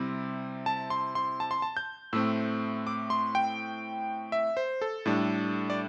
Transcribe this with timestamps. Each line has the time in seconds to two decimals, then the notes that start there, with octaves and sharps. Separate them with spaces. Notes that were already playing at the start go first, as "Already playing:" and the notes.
Already playing: C3 G3 C4 E4
0.66 A5
0.90 C6
1.15 C6
1.40 A5
1.51 C6
1.62 A5
1.77 G6
2.13 A2 A3 C4 E6
2.87 D6
3.10 C6
3.35 G5
4.32 E5
4.57 C5
4.82 A4
5.06 A2 G3 D4
5.70 D5